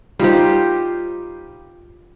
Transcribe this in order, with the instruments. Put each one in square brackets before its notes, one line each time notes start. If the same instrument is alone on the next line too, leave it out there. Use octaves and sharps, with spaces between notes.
[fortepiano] G3 D#4 C5 [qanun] F4 G4